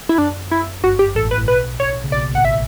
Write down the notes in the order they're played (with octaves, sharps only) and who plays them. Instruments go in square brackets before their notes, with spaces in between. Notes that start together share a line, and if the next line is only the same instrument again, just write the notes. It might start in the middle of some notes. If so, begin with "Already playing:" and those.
[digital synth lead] E4
[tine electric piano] F#2 [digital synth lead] D4
[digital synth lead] E4
[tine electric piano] G1 G2 [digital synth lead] F#4
[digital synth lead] G4
[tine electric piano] A1 A2 [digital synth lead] A4
[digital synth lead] B4
[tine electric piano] A2
[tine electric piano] B1 B2 [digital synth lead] B4
[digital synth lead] C#5
[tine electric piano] C#3
[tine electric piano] B1 B2 [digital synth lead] D5
[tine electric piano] A1 A2 [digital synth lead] F#5
[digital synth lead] E5